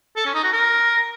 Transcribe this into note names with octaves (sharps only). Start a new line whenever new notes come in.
A4
C#4
D#4
F#4
A#4